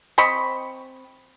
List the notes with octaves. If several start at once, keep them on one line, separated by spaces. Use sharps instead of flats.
C4 D#5 B5 C#6